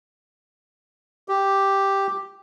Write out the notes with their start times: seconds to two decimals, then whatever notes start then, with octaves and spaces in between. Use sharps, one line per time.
1.28 G4